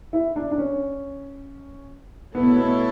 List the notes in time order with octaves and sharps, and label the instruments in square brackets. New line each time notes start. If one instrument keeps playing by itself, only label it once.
[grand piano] E4
D4
D4
C#4
[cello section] B2 A3 E4 A4 C#5 [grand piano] B3
[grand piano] B3